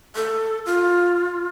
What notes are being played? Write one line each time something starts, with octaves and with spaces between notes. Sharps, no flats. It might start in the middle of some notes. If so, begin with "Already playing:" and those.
A4
F4